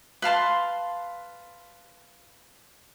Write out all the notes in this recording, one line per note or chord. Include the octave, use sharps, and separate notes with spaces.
B4 F5 A5 C6